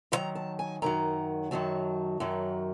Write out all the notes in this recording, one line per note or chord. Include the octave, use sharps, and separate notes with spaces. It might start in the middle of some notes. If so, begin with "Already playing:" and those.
F#2 D#3 F#3 A#5
A5
G#5
F#2 D#3 F#3 A#5
F#2 D#3 F#3 A5
F#2 D#3 F#3